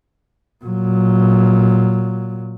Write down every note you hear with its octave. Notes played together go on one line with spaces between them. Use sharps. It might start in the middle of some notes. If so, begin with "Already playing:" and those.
A#2 F#3